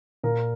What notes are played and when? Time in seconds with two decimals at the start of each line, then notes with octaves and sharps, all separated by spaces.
0.24 A#2 A#4